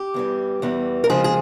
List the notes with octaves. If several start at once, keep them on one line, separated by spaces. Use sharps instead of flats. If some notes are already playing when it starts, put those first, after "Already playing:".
Already playing: G4
E2 E3 G3
E2 E3 G3
A#4
F2 C#3 F3 G#3 G#4
G#4